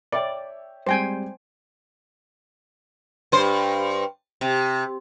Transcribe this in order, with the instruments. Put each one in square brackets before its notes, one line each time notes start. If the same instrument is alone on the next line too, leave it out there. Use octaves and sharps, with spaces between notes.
[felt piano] C#5 E5 G5 [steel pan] D5
[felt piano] G3 G#3 C4 [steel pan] C5 G5 G#5
[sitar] G2 C5
C3